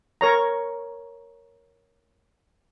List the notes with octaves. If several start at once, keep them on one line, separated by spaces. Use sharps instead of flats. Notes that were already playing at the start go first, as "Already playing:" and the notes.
A#4 C#5 A#5